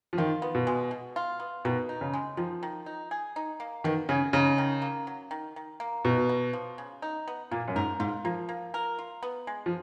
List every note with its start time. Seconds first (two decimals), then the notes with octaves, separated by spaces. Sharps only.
0.13 F3
0.18 D#3 F4
0.42 B3
0.55 B2
0.67 G#3
0.91 B2
1.16 F4
1.40 B3
1.65 B2 D#3
1.89 D#4
2.01 C#3
2.14 G#3
2.37 D#3 F3
2.63 D#3
2.86 D#4
3.11 G#4
3.36 D#4
3.60 A#3
3.84 B2 D#3
4.09 C#3 G#4
4.33 C#3 D#4
4.58 D#3
4.82 A#3
5.07 F#3
5.31 D#3
5.56 D#3
5.80 A#3
6.05 B2 D#4
6.29 B3
6.53 F3
6.78 C#3
7.02 D#4
7.27 B3
7.51 A#2 A#3
7.68 F#2
7.76 G#2 A#4
8.00 G#2 F4
8.25 F3 A#3
8.49 A#3
8.74 A#4
8.99 F4
9.23 B3
9.47 G#3
9.66 F3